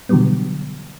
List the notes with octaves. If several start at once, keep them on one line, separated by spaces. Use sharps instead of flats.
B2 D3 E3 F#3 G3 B3